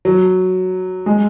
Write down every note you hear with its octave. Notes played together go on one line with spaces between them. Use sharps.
F#3
G#3